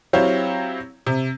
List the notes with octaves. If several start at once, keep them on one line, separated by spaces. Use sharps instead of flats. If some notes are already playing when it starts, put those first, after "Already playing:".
F#3 C4 E4 G4 C#5 F5
C3